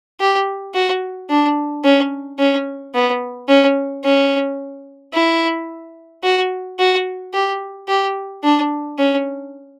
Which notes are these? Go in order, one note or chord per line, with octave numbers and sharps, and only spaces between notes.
G4
F#4
D4
C#4
C#4
B3
C#4
C#4
E4
F#4
F#4
G4
G4
D4
C#4